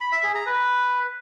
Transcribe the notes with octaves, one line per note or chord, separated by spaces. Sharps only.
B5
E5
G#4
A#5
B4